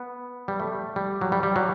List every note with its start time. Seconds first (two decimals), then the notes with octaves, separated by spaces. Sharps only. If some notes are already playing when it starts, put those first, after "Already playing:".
Already playing: B3
0.48 G3
0.60 A3
0.96 G3
1.21 F#3
1.32 G3
1.43 G3
1.56 F#3